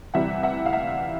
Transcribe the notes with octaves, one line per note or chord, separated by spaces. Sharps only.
C3 E3 G3 E5 F#5
E5 F#5
F5
E5 F#5